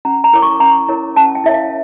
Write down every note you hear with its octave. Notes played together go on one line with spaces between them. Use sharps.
C#4 A#5
A#5
E4 A#4 C#5 D6
C#6
C#4 A#5
E4 A#4 C#5
C#4 A5
G5
E4 A#4 C#5 E5
F5